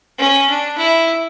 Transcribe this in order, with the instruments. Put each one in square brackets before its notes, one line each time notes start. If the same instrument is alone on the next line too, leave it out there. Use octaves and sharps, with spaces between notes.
[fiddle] C#4
D4
E4